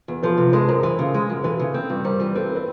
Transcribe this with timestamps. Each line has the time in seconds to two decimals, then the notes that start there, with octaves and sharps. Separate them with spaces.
0.08 E2
0.22 F3 A4 B4
0.37 C3
0.53 G#3 A4 B4
0.68 F#2 A#4 C5
0.83 E3 A#4 C5
0.99 C#3
1.14 G#3
1.30 F#2
1.44 E3 A4 B4
1.60 C#3
1.74 C4
1.90 G2
2.05 G3 A#4 C5
2.20 E3
2.35 C4 A4 B4
2.55 B4